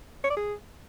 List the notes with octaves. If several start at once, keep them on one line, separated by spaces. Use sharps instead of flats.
C#5
D5
G#4